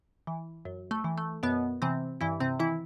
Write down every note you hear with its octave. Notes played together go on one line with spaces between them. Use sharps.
E3
F#2
A3
E3
A3
F#2 B2 B3
C3 E3 C4
G2 E3 E4
C3 C4
D#3 E3 E4